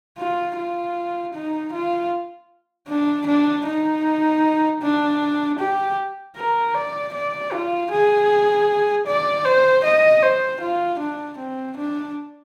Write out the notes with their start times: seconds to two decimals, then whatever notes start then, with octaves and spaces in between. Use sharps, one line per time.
0.18 F4
0.57 F4
1.34 D#4
1.73 F4
2.88 D4
3.27 D4
3.66 D#4
4.82 D4
5.59 G4
6.36 A#4
6.75 D5
7.14 D5
7.52 F4
7.91 G#4
9.07 D5
9.45 C5
9.84 D#5
10.23 C5
10.61 F4
10.99 D4
11.39 C4
11.77 D4